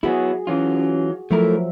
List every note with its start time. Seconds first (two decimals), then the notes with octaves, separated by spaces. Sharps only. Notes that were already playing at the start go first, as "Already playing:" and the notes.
0.03 F#3 B3 E4 F#4 G#4
0.47 E3 F#3 C#4 F4
1.31 F3 F#3 A3 E4 A4 A#4 E5